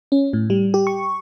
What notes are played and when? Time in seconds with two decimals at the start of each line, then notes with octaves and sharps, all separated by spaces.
0.12 C#4
0.33 A2
0.50 G3
0.74 G4
0.87 C#6